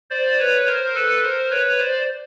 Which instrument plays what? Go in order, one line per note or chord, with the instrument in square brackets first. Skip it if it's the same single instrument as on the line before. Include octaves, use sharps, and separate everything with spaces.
[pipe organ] C5 D5
B4 C#5
A#4 C5
A4 B4
A#4 C5
B4 C#5
C5 D5